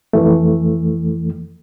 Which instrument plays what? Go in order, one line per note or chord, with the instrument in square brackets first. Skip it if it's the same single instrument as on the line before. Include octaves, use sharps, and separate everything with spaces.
[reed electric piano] F2 E3 A3